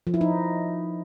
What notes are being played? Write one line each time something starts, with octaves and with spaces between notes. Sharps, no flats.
F3
E4
D#4